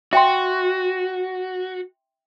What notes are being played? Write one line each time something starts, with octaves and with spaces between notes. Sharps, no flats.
F#4 E5 G5 C6